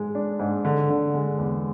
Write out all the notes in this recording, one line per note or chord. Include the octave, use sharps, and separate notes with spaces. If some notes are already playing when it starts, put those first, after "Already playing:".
Already playing: G#2 G#3
D4
G#2
D3
D3
G#3
E2